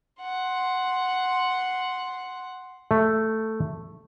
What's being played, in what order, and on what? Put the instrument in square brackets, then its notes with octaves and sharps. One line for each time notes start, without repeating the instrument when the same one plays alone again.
[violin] F#5 C6
[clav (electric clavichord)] A3